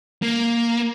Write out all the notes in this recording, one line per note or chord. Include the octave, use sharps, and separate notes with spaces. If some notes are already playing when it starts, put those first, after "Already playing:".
A#3